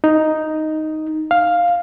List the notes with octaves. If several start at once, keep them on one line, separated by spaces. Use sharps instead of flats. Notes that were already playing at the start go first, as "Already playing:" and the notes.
D#4
F5